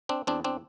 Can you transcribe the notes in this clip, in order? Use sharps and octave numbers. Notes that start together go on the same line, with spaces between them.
C4 D4
E2 C4 D4
C4 D4